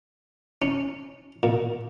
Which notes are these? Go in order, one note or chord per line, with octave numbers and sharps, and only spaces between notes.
C#4
A#2